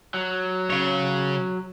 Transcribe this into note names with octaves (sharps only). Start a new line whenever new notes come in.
F#3
C#3 C#5